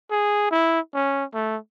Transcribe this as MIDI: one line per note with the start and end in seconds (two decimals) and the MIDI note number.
0.11 0.50 68
0.51 0.80 64
0.94 1.25 61
1.34 1.57 57